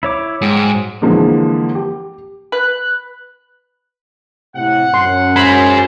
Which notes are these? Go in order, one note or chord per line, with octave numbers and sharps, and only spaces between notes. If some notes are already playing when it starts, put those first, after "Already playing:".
E4 C#5 D6
G#2 F#3 G#4 G5
D3 E3 F3 G#3 A#3
G4
B4 F#6
A2 C3 F#5
F#2 C6
G#4 C5 B5